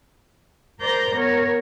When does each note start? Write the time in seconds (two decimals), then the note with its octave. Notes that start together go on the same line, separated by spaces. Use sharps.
0.79 A#4 C5 D5 A#5 G6 A#6
1.14 B3 A#4 C#5